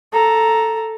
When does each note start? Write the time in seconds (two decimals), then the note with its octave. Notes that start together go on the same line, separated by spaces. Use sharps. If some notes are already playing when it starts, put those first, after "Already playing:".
0.13 A4 A#5